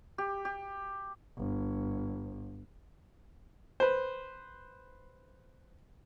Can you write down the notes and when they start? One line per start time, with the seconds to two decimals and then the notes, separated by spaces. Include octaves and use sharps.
0.18 G4
0.45 G4
1.38 G1
3.80 B4 C5